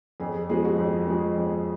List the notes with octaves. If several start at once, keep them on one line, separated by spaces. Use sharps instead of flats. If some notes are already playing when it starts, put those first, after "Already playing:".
F2 G#4
G#4
F3 G#3 G#4
F#4
F2
F3 G#3
F2